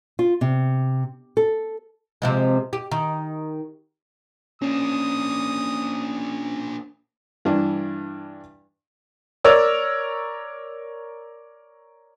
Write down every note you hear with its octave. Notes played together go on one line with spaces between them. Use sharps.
F4
C3
A4
C3 F3 G#3
G4
D#3
A#3 C#4 D4 D#6
G2 E3 D4 E4
A#4 C#5 D5 E6